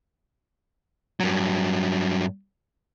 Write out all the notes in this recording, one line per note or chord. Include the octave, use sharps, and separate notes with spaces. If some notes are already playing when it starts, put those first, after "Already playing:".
G2 F#3